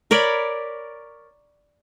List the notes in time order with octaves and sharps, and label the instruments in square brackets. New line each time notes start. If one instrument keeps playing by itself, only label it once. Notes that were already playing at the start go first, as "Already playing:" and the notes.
[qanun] A#4 C#5 D5 B5